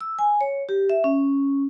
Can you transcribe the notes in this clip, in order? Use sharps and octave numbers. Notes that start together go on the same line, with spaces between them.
E6
G#5
C#5
G4
E5
C#4